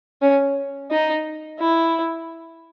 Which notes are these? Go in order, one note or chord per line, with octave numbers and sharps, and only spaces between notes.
C#4
D#4
E4